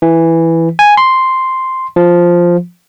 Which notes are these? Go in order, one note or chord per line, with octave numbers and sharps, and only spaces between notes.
E3
G#5
C6
F3